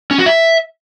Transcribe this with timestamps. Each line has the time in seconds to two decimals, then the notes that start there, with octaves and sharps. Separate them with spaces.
0.11 C#4
0.18 F#4
0.26 E5